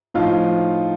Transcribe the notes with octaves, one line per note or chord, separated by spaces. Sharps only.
A2 F3 D#4 F4